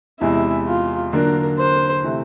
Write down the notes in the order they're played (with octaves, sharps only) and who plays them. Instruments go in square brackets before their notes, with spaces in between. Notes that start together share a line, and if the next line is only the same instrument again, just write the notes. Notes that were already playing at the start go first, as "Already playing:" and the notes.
[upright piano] E2 C3 E3 G#3 [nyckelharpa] E4
[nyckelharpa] F4
[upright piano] D3 F#3 A#3 D4 [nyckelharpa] A#4
[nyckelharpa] C5
[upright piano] C3 E3 A3